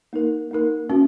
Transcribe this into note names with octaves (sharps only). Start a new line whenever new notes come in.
A#3 D#4 A#4
A#3 D#4 A#4
C#4 F#4